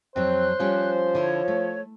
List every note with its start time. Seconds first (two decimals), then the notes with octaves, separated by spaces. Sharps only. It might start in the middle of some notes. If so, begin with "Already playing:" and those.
0.16 F2 F#3 C4 C5 F#6
0.60 F3 G3 C#4 G4
1.15 D3 E4 C#5
1.48 A3